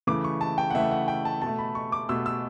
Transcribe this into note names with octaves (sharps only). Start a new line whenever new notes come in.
C#3 E3 A3 D6
C#6
A5
G5
F#5
C#3 E3 A3 E5
F#5
G5
A5
B2 A3 A5
B5
C#6
D6
B2 A3 E6
E6